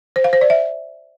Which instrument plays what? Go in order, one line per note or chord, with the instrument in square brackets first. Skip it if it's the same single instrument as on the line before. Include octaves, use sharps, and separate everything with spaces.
[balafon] C5
F5
C5
D5
E5